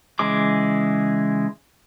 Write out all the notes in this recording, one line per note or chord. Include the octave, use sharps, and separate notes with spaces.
C#3 E3 G#3 D6